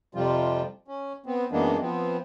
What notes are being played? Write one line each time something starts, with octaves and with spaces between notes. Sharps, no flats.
F2 C3 F3 G3 F4
C#4
B3 C4
F#2 E3 G#3 A#3 B3 D4
F3 B3 C4